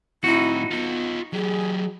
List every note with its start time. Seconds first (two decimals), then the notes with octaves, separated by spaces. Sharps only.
0.24 A2 C4 D#4 E4 F#4
0.71 B3 F4 D#5
1.33 F#3 G4 G#4